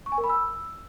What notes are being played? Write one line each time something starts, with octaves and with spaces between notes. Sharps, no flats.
C#6
G#5
A#4
B5
E6